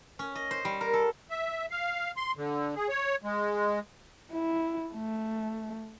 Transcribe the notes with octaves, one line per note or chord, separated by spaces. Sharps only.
C#4
D#5
C5
G3
A#4
A4
E5
F5
C6
D3
G#4
C#5
G#3
E4
A3